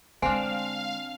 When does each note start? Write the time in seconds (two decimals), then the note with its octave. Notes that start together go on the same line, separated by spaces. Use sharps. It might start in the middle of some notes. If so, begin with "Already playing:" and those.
0.22 D3 G#3 C4 D4 F5 G#5 C6